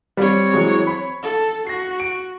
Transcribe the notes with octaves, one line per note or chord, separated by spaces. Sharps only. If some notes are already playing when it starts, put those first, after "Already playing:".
G3 C4 C#5
E3 F#3 G#3
B5
A4
F#4 A#6 C7
D7